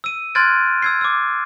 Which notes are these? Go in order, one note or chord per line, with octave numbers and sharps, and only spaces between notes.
E6 D#7
C6 F6 F#6 G#6 A6 D7
E6 G#6 C7
D6 E6